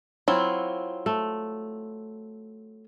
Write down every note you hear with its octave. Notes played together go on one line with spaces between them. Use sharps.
F#3 C4 E4 F4
A3